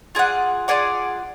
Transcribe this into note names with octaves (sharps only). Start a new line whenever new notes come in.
F4 G#4 D5 F#5
F4 G#4 D5 F#5